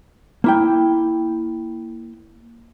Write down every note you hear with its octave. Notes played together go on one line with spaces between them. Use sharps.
A#3 E4 G5